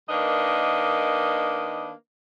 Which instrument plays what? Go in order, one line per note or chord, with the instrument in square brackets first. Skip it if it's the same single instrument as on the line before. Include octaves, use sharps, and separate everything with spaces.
[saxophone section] D#3 A#3 D4 B4 D#5